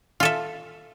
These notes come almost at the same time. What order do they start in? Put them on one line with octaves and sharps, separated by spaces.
F4 A4 E5